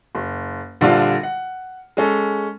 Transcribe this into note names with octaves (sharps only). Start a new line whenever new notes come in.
F#1
A#1 D3 G3 D4 F4
F#5
G#3 C#4 A4